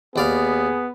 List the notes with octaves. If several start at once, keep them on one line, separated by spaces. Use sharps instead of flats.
D#2 B3 G#4 D5 F5